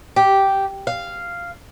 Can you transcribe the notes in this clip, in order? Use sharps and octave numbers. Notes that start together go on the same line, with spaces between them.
G4
F5